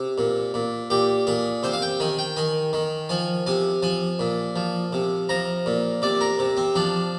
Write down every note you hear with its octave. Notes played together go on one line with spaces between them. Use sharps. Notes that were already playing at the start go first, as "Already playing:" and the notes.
Already playing: C3
A#2
A#2
A#2 G4
A#2 G#4
C3 C5
F5
G5
D#3 G#5
G5
D#3 G#5
D#3
F3 G#5
C3 G#5
F3 G#5
A#2
F3
C3
F3 A#5
A#2
C3 D5
A#4
C3
C4
F3 D4